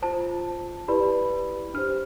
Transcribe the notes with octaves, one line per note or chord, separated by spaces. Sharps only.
F4 C5 A5
E4 G4 B4 D5 B5
D4 G4 C5 F6